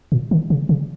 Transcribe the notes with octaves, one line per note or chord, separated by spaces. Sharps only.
A#2
D#3
C#3
C#3